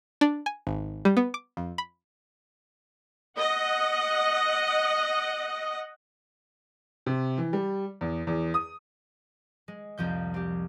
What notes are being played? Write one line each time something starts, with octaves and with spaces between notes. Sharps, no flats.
D4
G#5
G#1
G3
B3
D6
F2
B5
D#5 F#5
C3
E3
G3
E2
E2
D#6
G#3
C2 F2 F3 G6
C4 G4